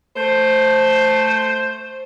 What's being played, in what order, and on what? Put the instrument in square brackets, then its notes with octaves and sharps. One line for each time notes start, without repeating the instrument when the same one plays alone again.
[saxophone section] A3 C5